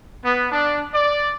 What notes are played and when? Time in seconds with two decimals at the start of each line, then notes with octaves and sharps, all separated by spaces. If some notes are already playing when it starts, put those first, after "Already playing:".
0.23 B3
0.52 D4
0.93 D5